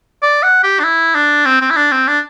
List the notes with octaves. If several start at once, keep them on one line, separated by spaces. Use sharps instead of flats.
D5
F#5
G4
D4
E4
D4
C4
C4
E4
D4
C4
D4